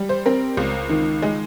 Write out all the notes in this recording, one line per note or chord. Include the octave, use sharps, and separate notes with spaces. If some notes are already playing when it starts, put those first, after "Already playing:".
Already playing: G3
C5
C4 A#4
C#2
D#3
G#3